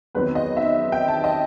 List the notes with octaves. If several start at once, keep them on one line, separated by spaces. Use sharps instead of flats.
E2 D#3 F#3 C4 D#4 B4
D#5
E5
G5
A5
D#5